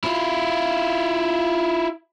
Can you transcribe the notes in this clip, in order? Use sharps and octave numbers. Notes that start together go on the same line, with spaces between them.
E4 F4